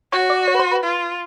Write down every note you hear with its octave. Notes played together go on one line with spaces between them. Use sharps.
F#4 C#5
D5
C#5
B4
C5
B4
F4